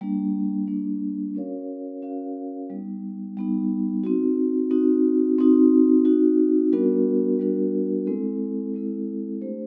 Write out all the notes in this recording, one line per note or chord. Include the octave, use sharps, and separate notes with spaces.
G3 A#3 D4
G3 A#3 D4
C#4 F#4 A#4 C#5 F5
C#4 F#4 A#4 C#5 F5
G3 B3 D#4
G3 B3 D#4
C4 D#4 F#4
C4 D#4 F#4
C4 D#4 F#4
C4 D#4 F#4
G3 B3 D4 F#4 A#4
G3 B3 D4 F#4 A#4
G#3 C4 E4 A4
G#3 C4 E4 A4
A3 D4 G4 C5